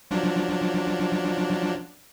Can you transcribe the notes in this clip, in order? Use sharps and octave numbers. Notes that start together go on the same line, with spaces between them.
F3 F#3 D4